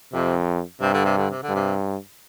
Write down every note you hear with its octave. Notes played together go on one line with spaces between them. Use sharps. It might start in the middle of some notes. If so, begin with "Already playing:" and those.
F2 C3
G2 C3
D3
C3
D3
C3
D3
G2
C3